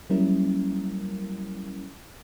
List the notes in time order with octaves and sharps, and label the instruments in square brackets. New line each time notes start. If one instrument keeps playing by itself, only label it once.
[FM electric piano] F#3 G3 A#3 C#4 E4 A#4